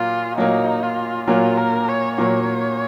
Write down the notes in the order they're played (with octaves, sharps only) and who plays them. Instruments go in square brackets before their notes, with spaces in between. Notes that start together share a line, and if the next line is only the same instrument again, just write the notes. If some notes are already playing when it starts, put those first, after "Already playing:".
Already playing: [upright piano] A#2 F#3 A#3 [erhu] F4
[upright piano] A#2 F#3 A#3 [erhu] D#4
[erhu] F4
[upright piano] A#2 F#3 A#3 [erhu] F4
[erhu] A#4
C#5
[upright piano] A#2 F#3 A#3 [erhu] C#5